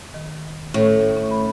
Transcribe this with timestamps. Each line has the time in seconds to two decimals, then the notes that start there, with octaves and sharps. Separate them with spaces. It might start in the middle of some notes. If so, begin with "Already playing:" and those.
0.14 D#3
0.74 A2 C#4 A4
1.17 C#4
1.31 B5